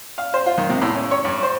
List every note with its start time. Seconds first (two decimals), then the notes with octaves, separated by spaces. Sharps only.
0.18 F5
0.34 C5
0.46 F4
0.58 D#3
0.69 C3
0.82 A2
0.95 C#4
1.11 C#5
1.25 G2
1.43 C5